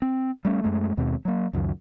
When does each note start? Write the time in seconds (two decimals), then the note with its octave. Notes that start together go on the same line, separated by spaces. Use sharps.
0.02 C4
0.45 G3 A3 C#4
0.64 F#2 G#3 A3
0.97 D#2 B2 G#3 C4
1.25 F#3 A#3
1.53 C#2 F#2 D#3